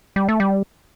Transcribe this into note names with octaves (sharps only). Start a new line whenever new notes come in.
G3
A3
G3